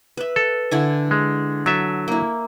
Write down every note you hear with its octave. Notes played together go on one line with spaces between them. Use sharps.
B4 E5
A4
D3 E4 G#5
G#3
F#3 A4 E5
A#3 E4